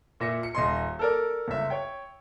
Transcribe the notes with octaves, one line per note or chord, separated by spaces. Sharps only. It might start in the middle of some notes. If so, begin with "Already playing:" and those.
A#2 E5 A#6 C#7
C#7
D#1 D#5 C6
A4 A#4 D5
G1 C#2 E5
C#5 G5